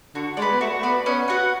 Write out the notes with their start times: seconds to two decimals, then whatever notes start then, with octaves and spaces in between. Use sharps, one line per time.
0.15 D3 F#4
0.37 G#3 D5
0.42 B4
0.52 B3
0.60 A3 F#4
0.78 A3
0.83 B3 B4 D5
1.06 B3 C#4
1.28 F#4 B4 F#5